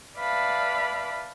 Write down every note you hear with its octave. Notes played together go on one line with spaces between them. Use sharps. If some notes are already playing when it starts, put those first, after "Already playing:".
B4 D5 E5 F5 A5 B5